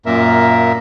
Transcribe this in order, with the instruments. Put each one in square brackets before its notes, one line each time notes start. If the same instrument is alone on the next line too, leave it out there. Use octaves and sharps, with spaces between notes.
[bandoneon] F#2 A#2 A#3 A#4 E5